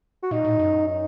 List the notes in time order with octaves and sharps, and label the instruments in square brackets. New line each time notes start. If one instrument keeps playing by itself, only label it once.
[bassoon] F#4
[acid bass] A#2 [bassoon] D#4
[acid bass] A2
F#2
[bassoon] D#4